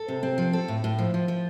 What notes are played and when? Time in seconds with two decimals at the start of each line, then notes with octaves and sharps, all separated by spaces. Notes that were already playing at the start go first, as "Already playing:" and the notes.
Already playing: A4
0.08 C3
0.23 C4
0.38 F3
0.53 A4
0.68 A2
0.84 A2
0.99 F3
1.14 F3
1.28 F3